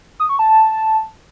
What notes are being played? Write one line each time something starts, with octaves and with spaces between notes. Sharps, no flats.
D#6
C#6
A5